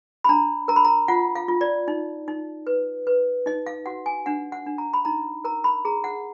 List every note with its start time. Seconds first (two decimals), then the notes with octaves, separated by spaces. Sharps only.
0.24 B5
0.29 D4 A#5
0.68 A#4 A#5
0.76 B5
0.85 A#5
1.08 F4 F#5
1.35 F5
1.48 F4
1.61 D5
1.88 D#4
2.28 D#4
2.67 B4
3.07 B4
3.46 D#4 D#5
3.66 F5
3.86 F#4 F#5
4.06 G#5
4.26 D4 F#5
4.52 F#5
4.66 D4
4.78 A#5
4.93 B5
5.05 D#4 A#5
5.44 A#4 A#5
5.64 B5
5.85 G#4 A#5
6.04 F#5